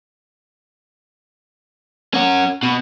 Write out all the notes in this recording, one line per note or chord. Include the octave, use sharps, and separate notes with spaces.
C#4 F#4
B2